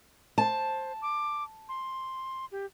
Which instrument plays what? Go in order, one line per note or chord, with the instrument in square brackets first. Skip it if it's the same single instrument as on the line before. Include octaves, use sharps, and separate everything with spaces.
[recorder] C5 [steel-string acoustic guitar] A5
[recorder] D6
C6
G4